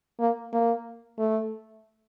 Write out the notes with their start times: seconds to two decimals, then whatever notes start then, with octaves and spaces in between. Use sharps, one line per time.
0.20 A#3
0.53 A#3
1.19 A3